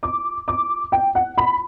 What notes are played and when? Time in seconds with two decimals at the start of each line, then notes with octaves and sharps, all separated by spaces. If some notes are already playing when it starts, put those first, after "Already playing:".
0.03 D6
0.48 D6
0.92 G5
1.15 F#5
1.38 B5